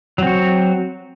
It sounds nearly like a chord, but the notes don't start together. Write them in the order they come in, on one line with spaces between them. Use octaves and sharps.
F#3 C4 F#4